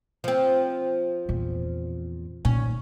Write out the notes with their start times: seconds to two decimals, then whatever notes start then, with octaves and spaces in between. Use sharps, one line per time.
0.24 F3 C4
1.29 E2 A#2
2.45 A#2 D#3 C#4